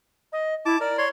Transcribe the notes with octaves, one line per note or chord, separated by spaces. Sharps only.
D#5
E4 A5 D6
A#4 D5
C#5 C6